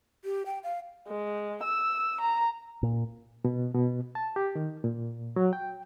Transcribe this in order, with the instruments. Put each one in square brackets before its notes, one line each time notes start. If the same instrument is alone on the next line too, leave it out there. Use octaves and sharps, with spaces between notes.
[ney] G4
G5
F5
[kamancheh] G#3
E6
A#5
[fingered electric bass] A#2
[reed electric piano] B2
B2
A5
G4
D#3
A#2
F#3
G5